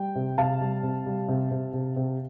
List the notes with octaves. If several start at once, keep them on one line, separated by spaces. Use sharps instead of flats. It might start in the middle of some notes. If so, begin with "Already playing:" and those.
Already playing: G3 G5
C3
C3 F5 A5
G3
C3
G3
C3
C3
C3
C3